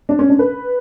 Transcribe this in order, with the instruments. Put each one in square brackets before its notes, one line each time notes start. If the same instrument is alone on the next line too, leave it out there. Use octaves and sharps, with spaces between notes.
[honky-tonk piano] D4
C#4
D4
B4